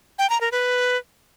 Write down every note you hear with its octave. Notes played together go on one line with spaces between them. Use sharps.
G5
A#5
A#4
B4